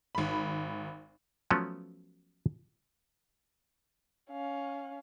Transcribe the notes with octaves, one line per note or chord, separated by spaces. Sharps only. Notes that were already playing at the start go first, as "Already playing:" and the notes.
G#1 B5
F3 F#3 A3 B3 C#4
C#4 F5